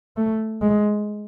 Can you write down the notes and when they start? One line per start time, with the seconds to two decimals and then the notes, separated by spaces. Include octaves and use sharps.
0.17 A3
0.62 G#3